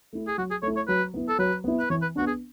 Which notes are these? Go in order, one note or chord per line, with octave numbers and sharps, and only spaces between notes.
A3 E4
G#4
F#3 F#4
G#4
A3 E4 C#5
C#5
F#3 B4
B3 E4
A4
F#3 B4
B3 E4
B4
E3 C#5
B4
B3 D4 F#4
G#4